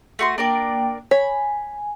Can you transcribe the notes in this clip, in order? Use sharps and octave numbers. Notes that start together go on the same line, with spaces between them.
A3 F#4 C6
A#3 D4 A#4 D5 G5
C#5 G#5 B5